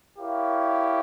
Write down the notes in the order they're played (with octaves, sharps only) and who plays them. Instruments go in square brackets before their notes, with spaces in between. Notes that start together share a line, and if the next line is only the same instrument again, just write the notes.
[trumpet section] E4 G4 A#4 C#5 F5